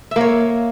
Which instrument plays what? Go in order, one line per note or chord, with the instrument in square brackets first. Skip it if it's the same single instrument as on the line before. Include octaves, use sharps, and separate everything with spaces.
[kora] E5
A#3
C#5